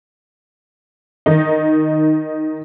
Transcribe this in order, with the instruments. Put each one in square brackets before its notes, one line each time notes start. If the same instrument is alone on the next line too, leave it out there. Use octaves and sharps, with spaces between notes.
[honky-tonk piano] D#3 D#4